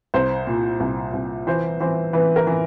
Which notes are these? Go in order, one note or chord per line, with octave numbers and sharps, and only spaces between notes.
C2 C5
A#2
C2
C2
E3 C5
E3 C5
E3 B4
A#4
E3